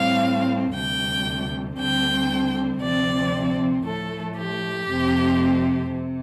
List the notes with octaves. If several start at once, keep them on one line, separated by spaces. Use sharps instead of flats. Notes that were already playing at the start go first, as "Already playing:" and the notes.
Already playing: A2 G3 C4 F5
D2 C3 G3 G5
D2 D3 G3 C4 G5
D2 C3 F3 C4 D5
A2 F3 A3 A4
G4
F2 C3 A3 C4
C3